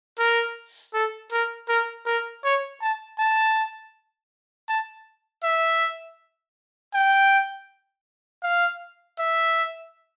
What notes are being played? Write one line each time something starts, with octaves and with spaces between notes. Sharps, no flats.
A#4
A4
A#4
A#4
A#4
C#5
A5
A5
A5
E5
G5
F5
E5